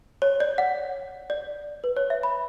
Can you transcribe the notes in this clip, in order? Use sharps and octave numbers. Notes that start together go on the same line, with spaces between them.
C#5
D5
F#5
D5
B4
C#5
E5
B5